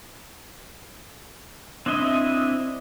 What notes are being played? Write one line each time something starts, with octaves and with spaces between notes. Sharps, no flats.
C4 D4 E4 D#5 E5